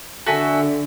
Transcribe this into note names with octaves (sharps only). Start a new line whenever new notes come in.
D3 F#4 A4 E5 G#5